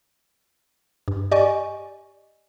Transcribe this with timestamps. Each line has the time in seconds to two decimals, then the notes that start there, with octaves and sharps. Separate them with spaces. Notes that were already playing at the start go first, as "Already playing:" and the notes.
1.08 G2
1.31 G4 D5 D#5 G#5 C#6